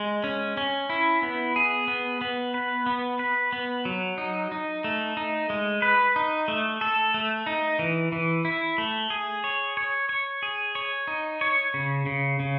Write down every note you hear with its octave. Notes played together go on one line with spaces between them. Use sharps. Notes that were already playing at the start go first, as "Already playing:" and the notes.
Already playing: G#3
C#4
C#4
E4
B3
G#4
B3
B3
B4
B3
B4
B3
F#3
D#4
D#4
A3
D#4
G#3
B4
D#4
A3
A4
A3
D#4
E3
E3
E4
A3
G#4
C#5
C#5
C#5
G#4
C#5
D#4
C#5
C#3
C#3
C#3